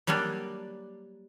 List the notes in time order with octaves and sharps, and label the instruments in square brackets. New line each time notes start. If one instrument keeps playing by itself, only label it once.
[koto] F#3 G3 A#3 D4 D5